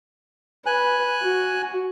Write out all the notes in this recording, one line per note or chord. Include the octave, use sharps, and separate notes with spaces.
B4 G#5 F#6
F#4